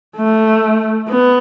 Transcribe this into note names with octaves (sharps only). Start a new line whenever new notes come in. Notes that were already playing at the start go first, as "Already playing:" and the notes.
A3
B3